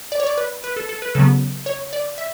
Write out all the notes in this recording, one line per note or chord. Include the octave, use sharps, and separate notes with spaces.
D5
C#5
D5
B4
B4
A4
A4
B4
C#3 F#3 B3 A4
C#5
D5
E5